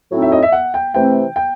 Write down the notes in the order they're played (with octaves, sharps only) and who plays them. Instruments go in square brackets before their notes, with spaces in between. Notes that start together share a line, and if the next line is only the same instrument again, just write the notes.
[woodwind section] A2 F#3 C4 D#4
[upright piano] E5
D#5
E5
F#5
G5
[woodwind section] C3 E3 A3 C4 [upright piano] G5
[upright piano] G5